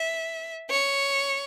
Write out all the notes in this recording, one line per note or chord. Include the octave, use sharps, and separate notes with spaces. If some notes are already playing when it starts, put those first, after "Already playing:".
Already playing: E5
C#5